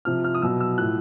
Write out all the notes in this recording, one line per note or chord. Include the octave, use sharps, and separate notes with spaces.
C3 F3 F6
F6
D#6
B2 F#3 E6
E6
A2 F3 F#6